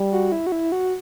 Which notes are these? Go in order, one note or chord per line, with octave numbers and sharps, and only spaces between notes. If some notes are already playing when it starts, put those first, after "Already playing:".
Already playing: G3
F#4
E4
F#4
E4
F#4